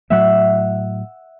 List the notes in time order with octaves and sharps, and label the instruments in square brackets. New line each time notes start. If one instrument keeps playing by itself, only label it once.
[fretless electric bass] A2 F#3 A3 [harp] E5 F#5